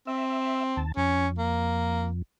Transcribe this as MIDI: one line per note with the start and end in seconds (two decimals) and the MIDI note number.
0.07 0.81 60
0.07 0.63 76
0.77 0.92 39
0.77 0.92 81
0.97 2.22 41
0.97 1.28 61
1.38 2.08 58